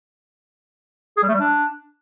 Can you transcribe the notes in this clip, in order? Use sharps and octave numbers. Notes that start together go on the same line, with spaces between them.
G#4
G3
A3
G3
D4